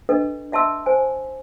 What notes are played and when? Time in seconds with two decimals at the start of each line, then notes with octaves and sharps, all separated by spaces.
0.09 D4 A4 B4 D#5
0.52 D#5 E5 A5 C6 E6
0.86 C5 G#5